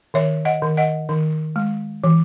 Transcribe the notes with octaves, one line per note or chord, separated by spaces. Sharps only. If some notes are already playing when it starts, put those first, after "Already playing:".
D#3 C#5 E5
D#5 F#5
D#3
D#5 F#5
D#3
G#3
E3